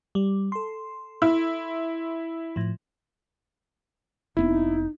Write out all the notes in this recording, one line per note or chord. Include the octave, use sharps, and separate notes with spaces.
G3
A4 C6
E4
A2 F3
F1 B3 C4 D#4 E4